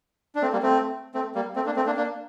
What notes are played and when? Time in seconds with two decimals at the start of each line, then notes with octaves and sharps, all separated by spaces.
0.35 D4
0.42 A3 C4
0.52 G3 A#3
0.62 A3 C4
1.14 A3 C4
1.35 G3 A#3
1.56 A3 C4
1.66 A#3 D4
1.76 A3 C4
1.86 A#3 D4
1.97 A#3 D4